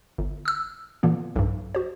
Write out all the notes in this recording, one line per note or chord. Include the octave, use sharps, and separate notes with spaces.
G1
D#6 E6
A#2 D3 E3 A#3 B3
B1 G2
F#4 C5